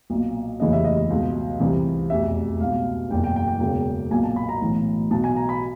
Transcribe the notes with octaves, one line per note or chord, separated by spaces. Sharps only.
B1 A#2
F1 D#2 C#3 E3 D#5
E5
D#5
C#2 B2
C2 C3 E3
F1 E2 B2 E5
C#2 B2 F5
F#1 E2 B2 G5
G5
G5
G5
E1 E2 C#3 G5
B1 A#2 G#5
A5
B5
A#5
B1 A2 E3
B1 B2 A5
G#5
A#5
B5